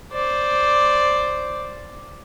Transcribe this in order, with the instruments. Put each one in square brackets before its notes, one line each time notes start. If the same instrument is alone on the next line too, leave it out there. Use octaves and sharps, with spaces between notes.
[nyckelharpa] C5 D5